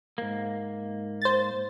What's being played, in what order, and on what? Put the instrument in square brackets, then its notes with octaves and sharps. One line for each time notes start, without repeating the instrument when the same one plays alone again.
[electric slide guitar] G#2 A#3
[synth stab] C5 A6